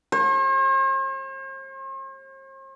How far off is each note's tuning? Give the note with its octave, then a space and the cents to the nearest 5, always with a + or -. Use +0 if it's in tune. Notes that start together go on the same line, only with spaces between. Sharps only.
C5 +45